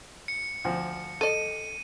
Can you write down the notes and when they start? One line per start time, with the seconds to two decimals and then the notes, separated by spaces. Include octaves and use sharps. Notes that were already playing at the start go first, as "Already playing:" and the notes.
0.28 C#7
0.64 D2 F3
1.21 A4 D#5 D#7